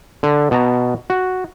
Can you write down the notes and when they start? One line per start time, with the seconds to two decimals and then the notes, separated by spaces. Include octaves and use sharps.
0.23 D3
0.51 B2 A5 A#5
1.10 F#4